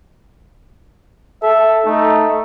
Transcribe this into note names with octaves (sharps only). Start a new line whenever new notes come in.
A4 E5
A3 D#4